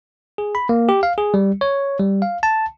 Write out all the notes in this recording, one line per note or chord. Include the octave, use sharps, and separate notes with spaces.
G#4
B5
A#3
G4
F5
G#4
G3
C#5
G3
F5
A5